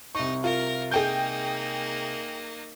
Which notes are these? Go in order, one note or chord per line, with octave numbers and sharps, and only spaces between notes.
C2 D#4 C#6
F4 A#4
A#3 D#4 G#4 G5 G6